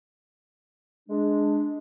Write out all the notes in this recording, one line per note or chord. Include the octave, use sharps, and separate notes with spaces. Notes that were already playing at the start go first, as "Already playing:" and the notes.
G#3 D4